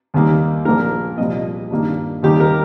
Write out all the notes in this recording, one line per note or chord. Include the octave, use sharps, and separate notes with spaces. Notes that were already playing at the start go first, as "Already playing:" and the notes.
D#2 D#3 G3 A#3
A#1 A#2 A#3 A#4
C2 A#2 F3 A#3 D#5
G2 D#3 A#3
D#2 D#3 G3 A#3 G4
A#4